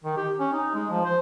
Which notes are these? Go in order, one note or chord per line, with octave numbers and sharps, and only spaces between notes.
D#3
G4
C#4
D#4
G#3
F3
C5